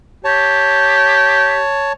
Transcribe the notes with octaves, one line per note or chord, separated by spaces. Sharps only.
G4 C#5 A5